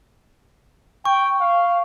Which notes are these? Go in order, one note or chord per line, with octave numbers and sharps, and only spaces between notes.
G5 C#6
F5